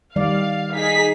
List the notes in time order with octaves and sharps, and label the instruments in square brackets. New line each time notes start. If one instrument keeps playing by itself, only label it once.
[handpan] D#3 G3 D5 [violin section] F5
[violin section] D#4 G#4 B6